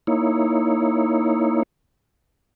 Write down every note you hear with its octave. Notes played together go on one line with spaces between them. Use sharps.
A#3 D#4 E4 C#5